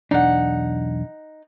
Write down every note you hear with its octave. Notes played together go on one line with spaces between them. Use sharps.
B1 E2 D4 D#4 F#5